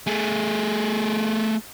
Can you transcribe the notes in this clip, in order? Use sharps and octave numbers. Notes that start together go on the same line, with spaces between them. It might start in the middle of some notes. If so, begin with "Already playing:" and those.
A3 G#4